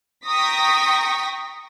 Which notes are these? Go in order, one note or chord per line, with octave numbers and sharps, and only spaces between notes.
G5 A#5 C#6 D#6 A#6 B6